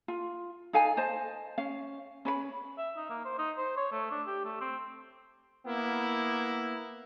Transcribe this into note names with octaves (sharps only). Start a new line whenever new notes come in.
F4
D#4 A4 F5 G#5
C5 D#5 A5
C#4 F5
C#4 B4 C5 B5
E5
D#4
A#3
C5
D#4
C5
C#5
A3
D4
G4
A3
C4
A#3 B3 E4